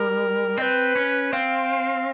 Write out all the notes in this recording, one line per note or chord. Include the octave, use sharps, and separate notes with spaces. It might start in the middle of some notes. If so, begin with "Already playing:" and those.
Already playing: G3 A#4
C4 B4 D#5
C#4
C4 F5